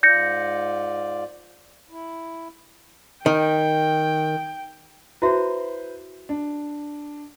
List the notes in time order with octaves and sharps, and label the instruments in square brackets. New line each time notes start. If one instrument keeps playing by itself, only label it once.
[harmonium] G#2 F4 D5 [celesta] G6 A#6 C#7
[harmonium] E4
[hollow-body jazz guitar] D#3 [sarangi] G5
[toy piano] E4 F#4 E5 [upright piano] B4 C5
[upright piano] D4